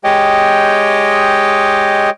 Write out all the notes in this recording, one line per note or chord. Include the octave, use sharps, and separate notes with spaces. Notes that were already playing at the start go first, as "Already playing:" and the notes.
G#3 G4 C#5 D#5 G5